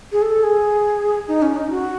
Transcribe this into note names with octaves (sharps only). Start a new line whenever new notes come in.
G#4
A4
G#4
D#4
C#4
D#4
F#4